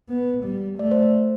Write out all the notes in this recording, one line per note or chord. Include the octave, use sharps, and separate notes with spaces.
B3
G3
A3 D5
C5
C5